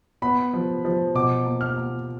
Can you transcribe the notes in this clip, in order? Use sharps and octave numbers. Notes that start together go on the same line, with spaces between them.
B3 B5
F3
F3
B2 D6
A#3
F6
A#3